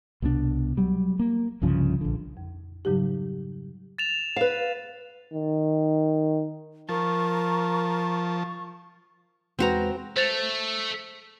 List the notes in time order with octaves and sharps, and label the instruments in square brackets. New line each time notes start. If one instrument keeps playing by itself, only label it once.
[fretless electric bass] C2 B2 E3 D4
F#3 G3
A#3
C2 G2 C#3 F3
A#1 D3
[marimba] F2
G#2 C#3 F#3 G3 D#4 G4
[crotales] A6 E7 F7
[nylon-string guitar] B4 F5
[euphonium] D#3
[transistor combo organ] F3 A5 [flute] A#4 [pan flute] C#6
[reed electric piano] E2 G#3 B4 [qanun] C4 F#4 A#5
[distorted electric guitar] A3 [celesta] C5 A6 F7